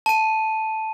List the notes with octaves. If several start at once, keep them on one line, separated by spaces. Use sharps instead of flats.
A5 D#7